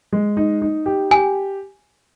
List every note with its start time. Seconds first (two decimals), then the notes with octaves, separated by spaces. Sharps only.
0.12 G#3
0.37 D#4
0.62 D#4
0.86 G4
1.11 G4 G#5